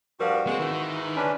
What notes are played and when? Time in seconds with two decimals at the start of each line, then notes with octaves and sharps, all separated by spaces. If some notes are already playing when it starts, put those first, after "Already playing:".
0.20 G2 F3 G3 F#4 A#4 F5
0.47 G#3 B3 C4
0.59 G#2 D#3 E3
1.16 C#4 D4 B4